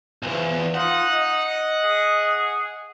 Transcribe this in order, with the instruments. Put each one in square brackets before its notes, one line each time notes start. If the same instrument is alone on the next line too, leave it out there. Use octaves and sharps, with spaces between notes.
[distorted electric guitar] B1 E2 [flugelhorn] F3
[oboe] D#4 [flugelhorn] F4 [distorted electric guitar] F#5
[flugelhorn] D#5
[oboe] G#4